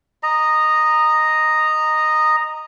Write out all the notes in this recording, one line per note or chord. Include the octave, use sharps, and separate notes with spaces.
D#5 A#5